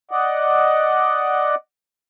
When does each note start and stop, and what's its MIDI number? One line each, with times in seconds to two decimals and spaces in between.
0.11 1.55 74
0.11 1.55 75
0.11 1.55 78